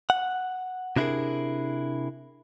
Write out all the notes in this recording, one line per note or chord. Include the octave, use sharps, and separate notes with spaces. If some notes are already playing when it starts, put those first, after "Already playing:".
F#5
C3 D4 E4 G4 G#4 A#4